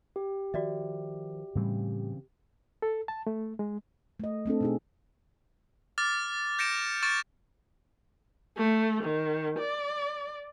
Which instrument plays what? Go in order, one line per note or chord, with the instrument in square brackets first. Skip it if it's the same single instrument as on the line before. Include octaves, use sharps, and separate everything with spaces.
[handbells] G4
[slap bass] D#3 F3 [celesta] F#4 D5 E5
[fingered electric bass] A2 G3 [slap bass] C#3 E3 C4
[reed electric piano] A4
A5
A3
G#3
[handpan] A3 D#5
A3 C4 D4 A4
B2 D#4 G#4
[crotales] D6 F6 A6
G6 A#6 C#7 D7 E7
C#6 F6 A6 D7 E7
[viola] A3
D#3
D5